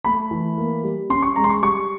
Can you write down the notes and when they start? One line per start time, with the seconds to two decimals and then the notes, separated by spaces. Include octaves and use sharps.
0.04 A3 B5
0.31 E3
0.57 A#3
0.84 G3
1.10 C#4 C6
1.22 C#6
1.36 G#3 A#5
1.44 C6
1.50 C#6
1.62 G3 C#6